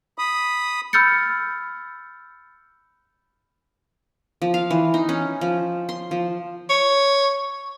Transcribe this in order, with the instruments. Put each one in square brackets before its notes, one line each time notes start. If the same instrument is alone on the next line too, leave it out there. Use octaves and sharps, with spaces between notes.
[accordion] B5 D#6
[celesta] B5 E6 F6 G6 A6 C#7
[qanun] F3
F5
E3
D#4
C#4
F3
C6
F3
[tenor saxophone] C#5